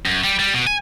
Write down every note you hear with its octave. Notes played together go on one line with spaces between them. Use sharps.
F#2
G3
G3
B2
G#5